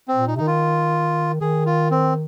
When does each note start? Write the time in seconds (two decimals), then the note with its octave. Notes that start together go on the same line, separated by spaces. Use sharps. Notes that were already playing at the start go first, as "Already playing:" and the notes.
0.08 C4
0.15 A#2
0.28 D#4
0.36 C3
0.38 D#3 D#4
0.47 F4
1.41 D#3 G#4
1.66 F4
1.91 C4